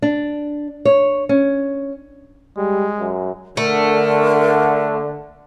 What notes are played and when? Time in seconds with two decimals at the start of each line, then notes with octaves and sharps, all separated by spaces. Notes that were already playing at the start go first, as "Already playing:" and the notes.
0.02 D4
0.85 C#5
1.29 C#4
2.57 G3 G#3
2.99 F#2
3.57 D3 A3 A#4